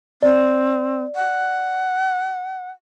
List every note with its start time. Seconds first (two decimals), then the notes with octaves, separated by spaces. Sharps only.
0.23 C4 D5
1.16 F#5